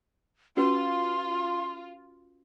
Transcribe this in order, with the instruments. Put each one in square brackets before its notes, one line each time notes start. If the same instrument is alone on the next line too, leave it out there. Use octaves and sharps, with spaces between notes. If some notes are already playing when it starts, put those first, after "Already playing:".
[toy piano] C#4 F#4 B4 [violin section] F4 [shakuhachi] C6